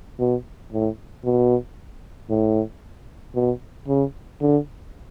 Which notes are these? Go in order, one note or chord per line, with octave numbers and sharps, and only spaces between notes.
B2
A2
B2
A2
B2
C#3
D3